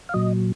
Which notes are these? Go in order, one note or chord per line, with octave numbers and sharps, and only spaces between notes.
F5
A#2 F#3 D#5